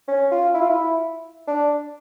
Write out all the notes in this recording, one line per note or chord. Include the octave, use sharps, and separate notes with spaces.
C#4
F4
E4
F4
E4
D4